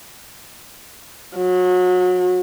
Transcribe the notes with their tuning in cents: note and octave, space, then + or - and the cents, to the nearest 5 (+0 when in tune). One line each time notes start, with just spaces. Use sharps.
F#3 -30